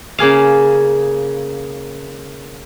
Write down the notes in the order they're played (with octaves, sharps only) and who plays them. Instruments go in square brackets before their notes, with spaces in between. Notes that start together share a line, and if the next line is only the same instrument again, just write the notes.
[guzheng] C#3 A#3 G#4 F5